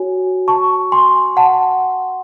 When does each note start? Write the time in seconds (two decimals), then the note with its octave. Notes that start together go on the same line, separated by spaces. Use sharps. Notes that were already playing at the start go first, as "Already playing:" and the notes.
Already playing: F#4 C#5 G#5
0.48 A5 C#6
0.92 G#5 C6
1.37 F#5 A5